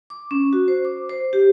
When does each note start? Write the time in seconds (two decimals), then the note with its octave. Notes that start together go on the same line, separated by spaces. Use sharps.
0.10 D6
0.31 C#4
0.53 F#4
0.68 C5
0.85 D6
1.09 C5
1.33 G4